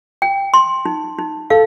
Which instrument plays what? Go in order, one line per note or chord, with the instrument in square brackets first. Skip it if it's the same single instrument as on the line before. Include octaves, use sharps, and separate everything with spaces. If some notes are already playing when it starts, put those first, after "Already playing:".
[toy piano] G5
C6
D#4
D#4
[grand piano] A4 [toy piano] F5